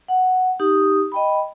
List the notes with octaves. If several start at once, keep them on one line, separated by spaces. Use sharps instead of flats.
F#5
D#4 G4 D#6
D#5 G5 B5